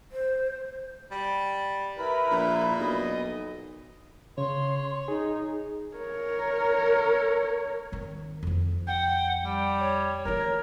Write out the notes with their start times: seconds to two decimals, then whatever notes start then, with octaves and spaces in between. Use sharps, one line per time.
0.12 C5
1.11 G3
1.98 E4 A#4 B4 B5
2.31 A#1 A#2
2.80 B1 D#5
4.38 C#3 C#5 C6
5.08 D#4 G#4
5.97 A#4 C#5
7.92 D#3 C4
8.43 F2 F3
8.87 F#5 G5
9.44 G3 G5
9.80 C#5
10.25 E3 A3 A#4